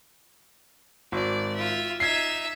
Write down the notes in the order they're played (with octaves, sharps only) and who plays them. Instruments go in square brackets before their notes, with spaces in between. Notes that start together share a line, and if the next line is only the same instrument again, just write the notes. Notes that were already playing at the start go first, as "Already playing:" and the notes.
[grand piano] G#1 [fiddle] D5
[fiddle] F4 E5
[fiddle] D#4 E5 [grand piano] G#6 C7